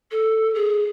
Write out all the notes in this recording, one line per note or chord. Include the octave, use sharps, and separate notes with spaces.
A4
G#4